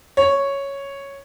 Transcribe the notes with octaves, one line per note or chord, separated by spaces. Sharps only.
C#5